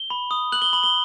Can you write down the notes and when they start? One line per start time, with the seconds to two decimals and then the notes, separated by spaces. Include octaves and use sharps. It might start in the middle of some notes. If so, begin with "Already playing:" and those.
Already playing: G7
0.10 B5
0.31 D#6
0.52 F#6 F#7
0.62 G7
0.73 B5 F#7
0.83 G7